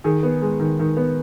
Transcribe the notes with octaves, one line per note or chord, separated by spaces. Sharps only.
D#3 G#4
B3
G#3
D#3
D#3
B3